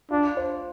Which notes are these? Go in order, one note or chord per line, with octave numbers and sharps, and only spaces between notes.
D4 F4
C5